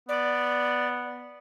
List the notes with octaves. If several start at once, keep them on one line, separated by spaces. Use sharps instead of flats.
B3 D5